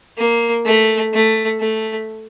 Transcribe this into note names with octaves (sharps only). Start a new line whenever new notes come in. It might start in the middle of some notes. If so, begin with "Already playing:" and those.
A#3
A3
A3
A3